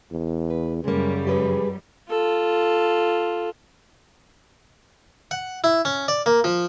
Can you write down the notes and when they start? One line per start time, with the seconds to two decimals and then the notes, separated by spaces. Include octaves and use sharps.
0.12 E2
0.50 B4
0.84 F#2 C#3 G3 G#3 A#3
1.27 G4 G#4 B4
2.10 F4 A4
5.31 F#5
5.64 E4
5.85 C#4
6.08 D5
6.26 A#3
6.44 F3